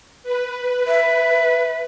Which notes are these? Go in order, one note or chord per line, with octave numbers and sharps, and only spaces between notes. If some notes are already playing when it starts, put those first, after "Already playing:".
B4
E5